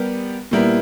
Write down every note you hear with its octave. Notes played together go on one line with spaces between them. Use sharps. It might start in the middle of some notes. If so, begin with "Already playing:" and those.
Already playing: G3 B3 G4 A#4
A#2 G3 B3 E4 A#4